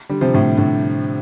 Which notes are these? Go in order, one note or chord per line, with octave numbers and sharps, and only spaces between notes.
D3 G3
C3 F3
A2 D3
A2 D3